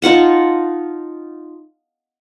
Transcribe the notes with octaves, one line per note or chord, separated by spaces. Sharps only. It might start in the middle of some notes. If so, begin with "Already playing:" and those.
D#4 F4 F#5 A5